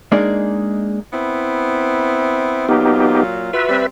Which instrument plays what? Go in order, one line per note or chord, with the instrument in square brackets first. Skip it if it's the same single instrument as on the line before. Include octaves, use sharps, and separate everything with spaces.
[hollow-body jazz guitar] G#3 A#3 D4 D#4 G#4 D5
[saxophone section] B3 C4 E4
[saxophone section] A#2 F#3 F5 [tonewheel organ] B3 D#4 G4
[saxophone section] F4 F#4 [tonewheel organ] B4 E5
[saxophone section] G3 C4